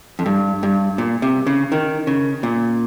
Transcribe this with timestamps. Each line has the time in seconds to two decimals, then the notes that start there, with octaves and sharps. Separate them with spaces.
0.19 F2
0.26 G2
0.63 G2
0.98 A#2
1.22 C3
1.47 C#3
1.72 D#3
2.07 C#3
2.43 A#2